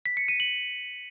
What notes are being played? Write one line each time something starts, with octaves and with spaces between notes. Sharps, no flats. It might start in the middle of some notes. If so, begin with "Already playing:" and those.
B6
C#7
D#7
F#7